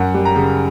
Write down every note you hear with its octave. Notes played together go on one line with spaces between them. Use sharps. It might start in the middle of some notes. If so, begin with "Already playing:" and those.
Already playing: F#2 F#5
G3
A#5
C#3